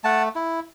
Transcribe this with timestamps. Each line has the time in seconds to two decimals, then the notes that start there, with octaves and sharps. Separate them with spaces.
0.04 A3 F#5 A5
0.35 E4